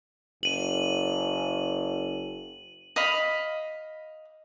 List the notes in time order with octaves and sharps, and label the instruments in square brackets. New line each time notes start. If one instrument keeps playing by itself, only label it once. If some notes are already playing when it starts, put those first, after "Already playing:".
[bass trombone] F#1 [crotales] D#7 F#7
[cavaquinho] D#5 F5 B5